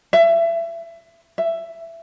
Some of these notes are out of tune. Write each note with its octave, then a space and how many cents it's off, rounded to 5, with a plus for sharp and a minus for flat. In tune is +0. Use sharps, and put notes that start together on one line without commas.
E5 +25
E5 +10